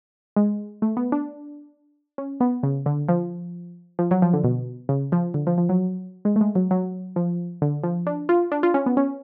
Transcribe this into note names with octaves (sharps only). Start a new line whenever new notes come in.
G#3
A3
B3
D4
C#4
B3
C#3
D3
F3
F3
F#3
F3
D3
B2
C#3
F3
D3
F3
F3
F#3
G#3
A3
G#3
F#3
F#3
F3
D3
F3
D4
F4
D4
F4
C#4
B3
C#4